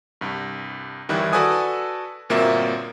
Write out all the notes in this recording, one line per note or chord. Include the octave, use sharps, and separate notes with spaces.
C2 G2
G1 D#3 E3 G3 E4 F#6
F#4 A4 B4 D5 G#5 D#6
G1 A#2 A#3 C4 F#4 E5